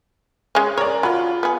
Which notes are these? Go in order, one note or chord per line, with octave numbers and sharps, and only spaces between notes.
G#3 C#4
A#4 C#5 D5
F#3 F4 B5
B3 G#4